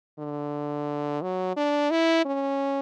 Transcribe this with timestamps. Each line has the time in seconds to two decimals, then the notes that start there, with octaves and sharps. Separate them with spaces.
0.19 D3
1.22 F#3
1.56 D4
1.91 E4
2.25 C#4